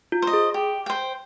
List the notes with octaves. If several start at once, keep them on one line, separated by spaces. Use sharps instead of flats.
F4
C5 D#5
G#4
G4
C5 G5